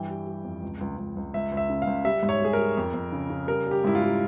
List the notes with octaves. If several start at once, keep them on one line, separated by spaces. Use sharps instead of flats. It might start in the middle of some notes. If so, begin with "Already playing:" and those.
Already playing: G2 E3 G5
G3
G3
F2
C#2
C#2
C#2
C#2
C#2 E5
C#2
E5
C#3
F5
C#2
G3 E5
G#2
C#5
G3 G#4
A#4
G3
F2
F2
C#3
C#3
G3 A#4
G3 G4
G#2 E4
F4
G3